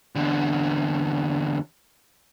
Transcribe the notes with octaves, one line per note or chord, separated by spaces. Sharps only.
E2 D3